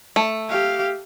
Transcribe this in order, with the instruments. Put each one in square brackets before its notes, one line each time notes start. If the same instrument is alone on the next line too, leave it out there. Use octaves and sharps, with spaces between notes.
[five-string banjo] A3
[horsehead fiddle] G4 F5